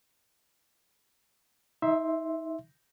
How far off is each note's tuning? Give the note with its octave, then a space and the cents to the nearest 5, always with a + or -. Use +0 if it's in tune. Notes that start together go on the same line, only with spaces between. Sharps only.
D#4 +35 E5 +0 C6 +0